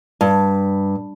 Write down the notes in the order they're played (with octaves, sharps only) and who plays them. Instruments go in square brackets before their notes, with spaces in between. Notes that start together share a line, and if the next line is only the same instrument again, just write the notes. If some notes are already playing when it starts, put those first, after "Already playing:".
[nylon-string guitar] G2